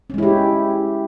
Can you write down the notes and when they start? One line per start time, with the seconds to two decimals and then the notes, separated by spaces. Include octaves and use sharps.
0.10 C#4
0.14 G#3
0.18 E4
0.23 G4